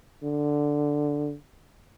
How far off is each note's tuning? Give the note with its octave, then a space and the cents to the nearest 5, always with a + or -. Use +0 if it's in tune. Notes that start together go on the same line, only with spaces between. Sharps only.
D3 +0